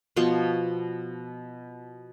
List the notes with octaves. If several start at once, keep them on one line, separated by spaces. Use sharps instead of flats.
B2 F3 C6 C#6